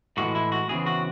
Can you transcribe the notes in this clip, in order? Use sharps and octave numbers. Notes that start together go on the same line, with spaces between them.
A2 E3 G#3 F#4
E4
F#4
E2 C#3 E3 C4 G#4
F#4